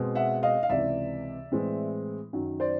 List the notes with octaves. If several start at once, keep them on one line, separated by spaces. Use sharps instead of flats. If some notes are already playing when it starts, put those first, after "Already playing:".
Already playing: B2 G#3 C4
E5 F#5
D#5 F5
F5
C#2 C3 E3 D5 E5
A2 E3 G#3 C4
F#2 D#3 F#3
C5 D5